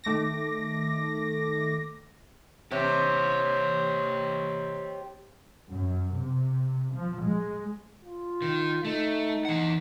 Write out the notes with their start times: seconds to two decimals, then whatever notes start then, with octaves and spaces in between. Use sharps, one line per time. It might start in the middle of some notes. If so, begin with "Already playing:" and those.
0.04 D#3 A3 D6 A#6
2.71 C3 G4 C#5
5.72 F#2
6.16 C3
6.93 F3
7.22 G#3
8.05 F4
8.42 D#3
8.85 A3 D#4
9.45 E3 F#5